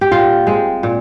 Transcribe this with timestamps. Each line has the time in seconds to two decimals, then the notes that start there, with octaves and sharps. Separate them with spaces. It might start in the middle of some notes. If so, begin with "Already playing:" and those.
0.01 G4
0.11 A#2 F4
0.47 G#3 C4
0.83 A#2